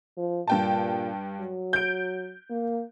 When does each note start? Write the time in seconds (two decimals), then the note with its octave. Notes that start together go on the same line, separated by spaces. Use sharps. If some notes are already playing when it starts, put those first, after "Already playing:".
0.17 F3
0.48 G2 A#2 G5 A5
1.40 F#3
1.73 G6 D7
2.50 A#3